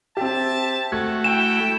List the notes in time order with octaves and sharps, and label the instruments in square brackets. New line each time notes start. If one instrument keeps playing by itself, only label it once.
[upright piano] C4 G4 [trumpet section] E5 A5
[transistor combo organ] A3 F#4 [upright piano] G#6
[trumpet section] E4 G5 [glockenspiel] E7